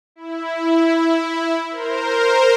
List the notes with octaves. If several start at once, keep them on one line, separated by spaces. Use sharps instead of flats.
E4
A#4 C5